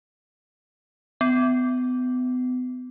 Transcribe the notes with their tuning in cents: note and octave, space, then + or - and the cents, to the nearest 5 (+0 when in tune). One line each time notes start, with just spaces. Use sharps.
B3 +35